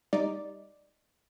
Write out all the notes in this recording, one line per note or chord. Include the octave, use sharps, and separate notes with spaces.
G3 D#4 D5